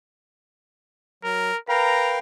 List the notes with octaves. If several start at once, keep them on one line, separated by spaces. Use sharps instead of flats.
F#3 A#4
A#4 B4 F5 G5 A#5